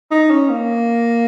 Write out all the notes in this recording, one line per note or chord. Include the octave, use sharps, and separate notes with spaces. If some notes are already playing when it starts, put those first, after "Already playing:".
D#4
C#4
A#3